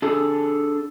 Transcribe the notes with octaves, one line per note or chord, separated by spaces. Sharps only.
D4 G#4 A4